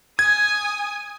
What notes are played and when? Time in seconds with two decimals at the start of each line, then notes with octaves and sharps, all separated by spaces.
0.19 G#5 D#6 G#6